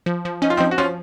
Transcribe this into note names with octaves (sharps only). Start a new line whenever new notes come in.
F3
F3
C#4 D#4
F4
C4 D#4
F3
F#4
F3 C#4 F4